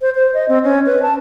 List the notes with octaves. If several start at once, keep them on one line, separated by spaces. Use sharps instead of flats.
C5
C5
D#5
C4
C#4
B4
A5